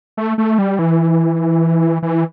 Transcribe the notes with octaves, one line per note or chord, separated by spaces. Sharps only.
A3
A3
G3
E3
E3